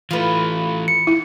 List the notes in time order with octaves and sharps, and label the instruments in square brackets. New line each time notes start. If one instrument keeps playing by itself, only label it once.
[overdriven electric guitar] E3 A3 [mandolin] F4 B4
[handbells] C#7
[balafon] E4